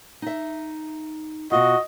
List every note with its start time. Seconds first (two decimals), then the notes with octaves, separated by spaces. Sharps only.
0.22 D#4 E5
1.52 B2 F4 F#4 D#5